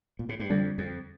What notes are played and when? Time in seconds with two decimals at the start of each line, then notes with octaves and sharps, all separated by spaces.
0.19 A#2
0.29 A2
0.39 G2
0.50 F2 D3 G3 D4
0.78 F2